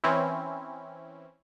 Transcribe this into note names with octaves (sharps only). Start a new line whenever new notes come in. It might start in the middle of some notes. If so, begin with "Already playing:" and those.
E3 C4 C#4 E4